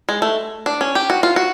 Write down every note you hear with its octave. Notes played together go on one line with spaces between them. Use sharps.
G#3
A3
D4
C#4
G4
F#4
F4
F#4